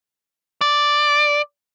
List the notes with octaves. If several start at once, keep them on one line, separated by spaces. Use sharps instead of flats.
D5